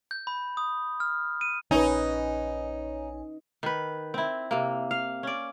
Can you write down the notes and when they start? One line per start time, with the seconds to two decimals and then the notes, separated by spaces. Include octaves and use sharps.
0.11 G6
0.27 B5
0.57 D#6
1.00 F6
1.41 D#7
1.71 A#1 C#4 D#4 B4 C#5 G#5
3.63 D#3 B4
4.14 C4 E4
4.51 C3 A#3
4.91 F5
5.23 C#4 D5